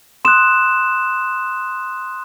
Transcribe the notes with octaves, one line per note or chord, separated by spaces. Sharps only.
C6 D#6 F#6 E7